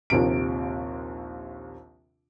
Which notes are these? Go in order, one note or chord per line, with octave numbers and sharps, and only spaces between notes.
A#1 D#2 C3 D7